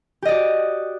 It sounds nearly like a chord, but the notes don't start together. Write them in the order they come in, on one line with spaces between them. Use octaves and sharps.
G4 D#5 D5 F#4